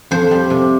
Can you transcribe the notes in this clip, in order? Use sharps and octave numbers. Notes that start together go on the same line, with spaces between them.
F2 C5
G3
C3